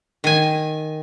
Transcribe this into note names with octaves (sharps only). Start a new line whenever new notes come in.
D#3 G#5